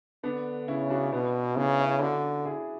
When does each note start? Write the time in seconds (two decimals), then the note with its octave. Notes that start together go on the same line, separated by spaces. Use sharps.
0.23 D3 B3 D4
0.68 C#3 C#4 E4
0.90 D4 F#4
1.12 B2 B3 D4
1.53 E4
1.57 C#3 B3 D4
1.79 C#4 E4
2.01 D3 D4 F#4
2.45 E4 G#4